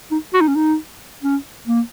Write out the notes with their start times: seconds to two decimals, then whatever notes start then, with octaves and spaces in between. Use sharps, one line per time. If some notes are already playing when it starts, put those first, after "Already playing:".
0.11 D#4
0.34 F#4
0.41 D#4
0.48 C#4
0.56 D#4
1.23 C#4
1.67 A#3